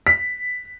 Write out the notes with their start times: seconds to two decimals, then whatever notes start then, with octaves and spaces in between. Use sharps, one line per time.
0.07 B6